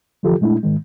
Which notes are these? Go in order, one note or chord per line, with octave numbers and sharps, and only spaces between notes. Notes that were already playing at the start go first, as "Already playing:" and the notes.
D3 E3 F3 F4 G4 A4
A#2 G#3 A3 D4 E4
G#2 D#3 G#3